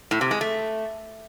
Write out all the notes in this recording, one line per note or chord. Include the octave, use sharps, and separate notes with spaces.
A2
C3
G#3
A3